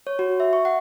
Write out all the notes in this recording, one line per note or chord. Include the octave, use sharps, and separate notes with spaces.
C#5
F#4
E5
C#6
F#5